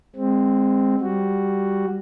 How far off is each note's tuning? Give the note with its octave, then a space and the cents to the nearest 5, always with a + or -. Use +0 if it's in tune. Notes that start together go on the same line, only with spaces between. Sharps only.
G#3 -15 C4 +5
G3 +0 F#4 +0